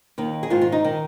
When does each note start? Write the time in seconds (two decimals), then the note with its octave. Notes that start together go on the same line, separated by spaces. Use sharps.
0.18 D#2 D#3
0.43 G#4
0.50 G#2 D#3 F4
0.61 F4
0.72 D#4
0.84 D#3